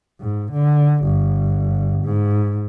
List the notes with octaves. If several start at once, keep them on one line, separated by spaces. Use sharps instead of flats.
G#2
D3
G1
G#2